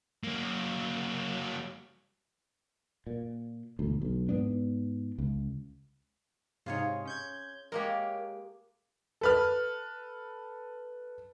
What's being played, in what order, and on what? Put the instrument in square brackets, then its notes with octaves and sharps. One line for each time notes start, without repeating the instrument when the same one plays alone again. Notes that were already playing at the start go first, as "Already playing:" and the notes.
[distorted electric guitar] F#3 A#3
[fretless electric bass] A#2
E1 D2
B1
G#2 B3 D4
C#2
[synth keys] G#2 C3 D#4 [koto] F4 G#4 C#5
[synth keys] C#4 G6 G#6
[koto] G#3 A#3 G4 [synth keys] A#4 C#5
[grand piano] A4 B4 F6